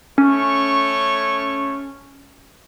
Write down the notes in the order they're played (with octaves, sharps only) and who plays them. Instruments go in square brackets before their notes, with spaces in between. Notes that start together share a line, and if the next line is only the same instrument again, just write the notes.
[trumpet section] A3 C#5 C#6 [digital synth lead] C#4